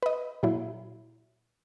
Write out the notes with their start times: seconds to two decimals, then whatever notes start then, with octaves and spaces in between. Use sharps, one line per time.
0.03 B4 D#5
0.43 A#2 F#3 E4